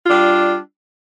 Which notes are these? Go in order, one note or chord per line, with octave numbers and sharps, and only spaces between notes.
G3 D4 F4